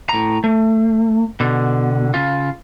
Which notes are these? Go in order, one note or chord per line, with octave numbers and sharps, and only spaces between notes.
A2 A#5
A3
B2 D3
C#3 F4